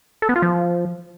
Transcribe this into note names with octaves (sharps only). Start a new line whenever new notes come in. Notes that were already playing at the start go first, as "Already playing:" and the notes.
A4
B3
F4
F3